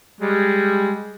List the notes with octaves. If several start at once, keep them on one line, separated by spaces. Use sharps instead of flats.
G3 G#3